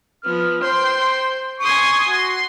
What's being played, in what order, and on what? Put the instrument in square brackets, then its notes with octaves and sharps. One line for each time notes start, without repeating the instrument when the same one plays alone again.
[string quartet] F3 B3 [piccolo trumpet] F6
[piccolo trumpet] C5 [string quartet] G5 C6
[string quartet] G#5 C6 D#6 [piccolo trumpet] C#6
[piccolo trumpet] F#4 [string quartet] C6